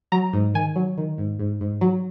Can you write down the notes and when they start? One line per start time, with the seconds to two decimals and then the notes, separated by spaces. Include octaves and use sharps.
0.12 F#3 A#5
0.33 G#2
0.54 D#3 G#5
0.76 F#3
0.98 D#3
1.18 G#2
1.39 G#2
1.61 G#2
1.81 F#3